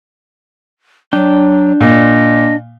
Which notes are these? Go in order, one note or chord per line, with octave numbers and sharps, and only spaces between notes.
F#3 D4 G5
A#2 D#5